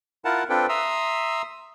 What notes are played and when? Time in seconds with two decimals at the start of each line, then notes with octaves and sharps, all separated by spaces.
0.25 E4 F4 A#4 F#5 A5
0.50 C4 D4 F4 A4 B4 G5
0.69 E5 A#5 C6 D#6 E6